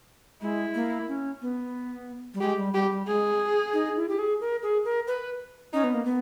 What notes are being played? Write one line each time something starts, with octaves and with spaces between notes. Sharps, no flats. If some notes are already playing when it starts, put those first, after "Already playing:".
G#3 E4
A#3
C#4
B3
G3
G#3 G4
G3
G3 G4
G3
G#3 G#4
D#4
E4
G4
G#4
A#4
G#4
A#4
B4
C#4 D#4
B3
A#3
B3